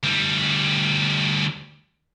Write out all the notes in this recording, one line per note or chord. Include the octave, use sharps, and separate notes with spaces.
D2 G3